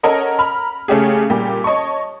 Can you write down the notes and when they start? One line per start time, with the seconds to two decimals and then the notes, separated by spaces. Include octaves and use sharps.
0.03 C#4 A4 A#4 D#5 F#5
0.39 A#5 B5 F6
0.88 C#3 A3 C#4 G4 G#4
1.30 A#2 G3 G4
1.64 C#5 D#5 A5 C#6